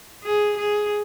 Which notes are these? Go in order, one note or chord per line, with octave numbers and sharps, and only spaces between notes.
G#4
G#4